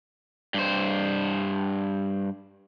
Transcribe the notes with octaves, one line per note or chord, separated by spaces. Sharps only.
G2 C5